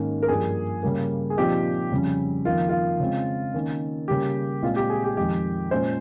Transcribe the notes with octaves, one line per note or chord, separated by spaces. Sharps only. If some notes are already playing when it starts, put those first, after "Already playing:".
Already playing: G#2 D#3 A#3 C#4
A#4
G2 F3 A#3 G#4
C#3 G3 A#3
G#4
A#2 F3 C4 D#4 G4
F2 C#3 G3 C#4
F2 D#3 A#3 F4
F4
C#3 G#3 C4
D#3 A#3 C#4
C#3 G3 A#3 G4
A#2 G#3 C4 F4
G4
G#4
G4
F2 D#3 G#3 G4
A#2 G#3 C#4 C5